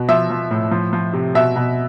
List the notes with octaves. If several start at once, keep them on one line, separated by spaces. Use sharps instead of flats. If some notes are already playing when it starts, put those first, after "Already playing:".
Already playing: B2
F3 E5
F3
A2
F3
F3
C3
B2 E5
B2